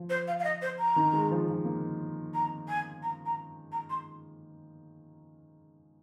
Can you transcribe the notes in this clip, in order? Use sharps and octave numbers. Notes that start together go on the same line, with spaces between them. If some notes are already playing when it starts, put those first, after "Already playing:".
Already playing: F3
C5
F5
F5
D#5
C5
A#5
D#3
G#3
F3
F3
A#3
A#5
G#5
A#5
A#5
A#5
C6